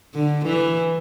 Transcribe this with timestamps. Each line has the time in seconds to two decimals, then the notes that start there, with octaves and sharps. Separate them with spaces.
0.15 D3
0.45 E3